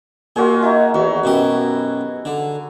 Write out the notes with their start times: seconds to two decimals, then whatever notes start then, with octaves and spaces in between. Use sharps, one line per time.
0.36 A#2 F4 F#4 G#4
0.63 D#4 E4
0.94 E2 F#4
1.24 F#2 B2 G4
2.25 D3